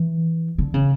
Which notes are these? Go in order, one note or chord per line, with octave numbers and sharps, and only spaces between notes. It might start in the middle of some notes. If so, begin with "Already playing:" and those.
Already playing: E3
D3
C#3